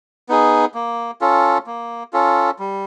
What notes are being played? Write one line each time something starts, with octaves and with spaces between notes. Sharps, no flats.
B3 D#4 G#4
A#3
C#4 F4 A4
A#3
C#4 F4 A4
G3